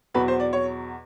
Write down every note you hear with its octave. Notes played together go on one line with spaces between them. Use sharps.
E2 B2 F#3 B4
C5
D5
C#5